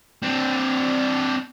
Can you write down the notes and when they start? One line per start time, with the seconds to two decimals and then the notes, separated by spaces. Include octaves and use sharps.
0.23 C4 D4